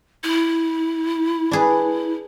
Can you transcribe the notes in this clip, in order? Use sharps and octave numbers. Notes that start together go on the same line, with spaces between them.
E4
D4 G#4 B4